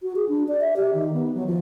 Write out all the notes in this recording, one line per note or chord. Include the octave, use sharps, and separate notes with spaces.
F#4
G#4
D4
D5
E5
G4
D#3
B3
F#3
F3